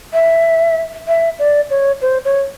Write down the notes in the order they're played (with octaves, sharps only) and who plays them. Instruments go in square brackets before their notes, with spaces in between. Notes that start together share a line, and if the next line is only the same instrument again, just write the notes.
[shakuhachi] E5
E5
D5
C#5
C5
C#5